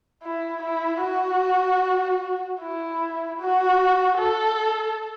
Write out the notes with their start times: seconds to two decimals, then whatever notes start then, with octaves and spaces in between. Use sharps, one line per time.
0.23 E4
0.63 E4
1.02 F#4
2.61 E4
3.40 F#4
4.19 A4